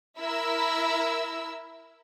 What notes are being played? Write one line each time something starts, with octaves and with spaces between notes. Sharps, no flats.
E4 A#4 E6